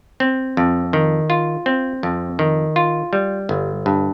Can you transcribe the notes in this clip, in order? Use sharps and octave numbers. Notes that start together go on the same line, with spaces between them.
C4
F2
D#3
F4
C4
F2
D#3
F4
G3
G1
G2